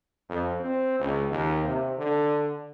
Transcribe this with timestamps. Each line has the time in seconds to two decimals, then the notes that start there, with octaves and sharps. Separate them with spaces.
0.29 F2
0.60 C4
1.00 C#2
1.30 D#2
1.65 C3
1.98 D3